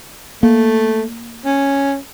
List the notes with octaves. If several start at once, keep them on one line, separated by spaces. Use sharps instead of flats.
A3 A#3
C#4